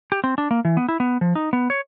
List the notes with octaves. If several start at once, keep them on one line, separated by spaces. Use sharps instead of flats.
G4
C4
D4
A#3
E3
B3
E4
B3
F3
D#4
B3
C#5